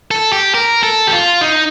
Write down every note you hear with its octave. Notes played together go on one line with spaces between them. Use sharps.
A4
G4
A#4
A4
G4
F4
D#4